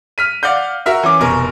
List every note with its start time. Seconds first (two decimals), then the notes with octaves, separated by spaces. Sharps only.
0.18 F6 B6 D#7
0.43 D5 F5 F#5 G6
0.86 F#4 A#4 E5 F6
1.03 E3 C#4 D6
1.20 F1 B2 A#4 G#5 C#6